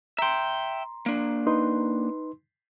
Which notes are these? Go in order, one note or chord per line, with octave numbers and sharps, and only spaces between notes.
E5 G5 A#5 C6
A#3 D4
D#4 B4 C6